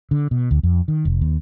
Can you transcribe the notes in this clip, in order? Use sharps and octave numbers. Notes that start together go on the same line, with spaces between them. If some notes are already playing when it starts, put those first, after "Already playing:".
D3
B2
D2
F2
D#3
F1
D#2